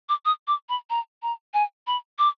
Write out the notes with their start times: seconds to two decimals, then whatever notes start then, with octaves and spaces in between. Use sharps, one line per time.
0.09 D6
0.25 D#6
0.48 D6
0.69 B5
0.90 A#5
1.23 A#5
1.54 G#5
1.87 B5
2.19 D6